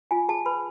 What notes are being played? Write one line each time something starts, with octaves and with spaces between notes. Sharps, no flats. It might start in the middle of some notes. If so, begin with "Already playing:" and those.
F4 G#5
G#4 A5
B4 B5